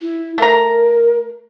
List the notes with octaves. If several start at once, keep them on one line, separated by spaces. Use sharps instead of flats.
E4
A3 A#4 A#5